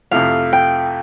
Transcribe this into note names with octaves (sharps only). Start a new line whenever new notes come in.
F2 C3 F3 A3 E4 F5
G5